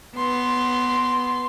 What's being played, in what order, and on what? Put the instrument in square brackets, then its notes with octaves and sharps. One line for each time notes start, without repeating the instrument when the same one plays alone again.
[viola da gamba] B3 [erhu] C6